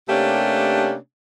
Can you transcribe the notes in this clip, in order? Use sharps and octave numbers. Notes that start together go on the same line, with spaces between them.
C3 A3 A#3 C#4 D4 G4